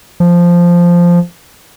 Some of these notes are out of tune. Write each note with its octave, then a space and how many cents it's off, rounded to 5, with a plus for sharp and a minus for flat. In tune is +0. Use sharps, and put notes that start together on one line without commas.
F3 -5